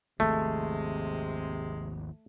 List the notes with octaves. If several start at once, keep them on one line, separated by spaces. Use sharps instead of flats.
G#1 D#2 C3 F3 G#3 A3